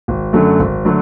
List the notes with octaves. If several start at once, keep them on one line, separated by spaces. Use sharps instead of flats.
G#1
F#2 D3 F#3 A3
G#1
D3 F#3 A3